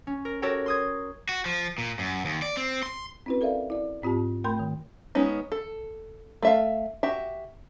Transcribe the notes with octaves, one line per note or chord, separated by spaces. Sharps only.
C#4
A#4
F#4 G4 A4 A#4 C#5 G5
C6 D#6 G#6
F#4
F3
A#2
F#2
D#2
D5
C4
C6
C4 C#4 E4 F#4 B4
A4 A#4 D5 E5 F5
E4 D5
G#2 C4 F4 G4 A5
A3 A#4 G5 B5 C6 G6
D#3
G#3 B3 C#4 D#4
A4
A3 E5 F5
F#4 G4 E5